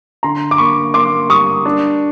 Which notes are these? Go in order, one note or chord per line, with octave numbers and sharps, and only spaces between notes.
D3 A#5 C6
D6
A#3 B5 C#6
A#3 C6 D6
G3 C#6 D#6
D4